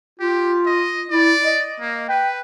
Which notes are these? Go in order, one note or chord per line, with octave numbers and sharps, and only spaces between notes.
F4 G4
D#5
E4 D5
D#5
A#3
B4 G5